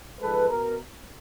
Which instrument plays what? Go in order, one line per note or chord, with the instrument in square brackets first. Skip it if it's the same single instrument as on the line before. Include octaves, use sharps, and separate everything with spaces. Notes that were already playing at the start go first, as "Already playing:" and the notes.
[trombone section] G#2 F3 G#3 A4 B4
B2 A#4